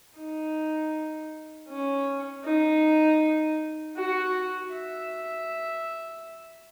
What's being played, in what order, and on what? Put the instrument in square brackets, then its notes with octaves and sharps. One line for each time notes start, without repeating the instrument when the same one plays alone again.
[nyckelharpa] D#4
C#4
D#4
F#4
E5